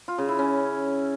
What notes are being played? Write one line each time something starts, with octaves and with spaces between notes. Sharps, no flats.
F4
C#3
E4
C#4